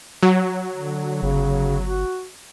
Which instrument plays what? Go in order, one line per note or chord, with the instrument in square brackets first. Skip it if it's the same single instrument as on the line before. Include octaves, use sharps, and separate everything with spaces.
[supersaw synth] F#3
[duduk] D3
[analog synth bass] G1 [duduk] C#3
[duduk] F#4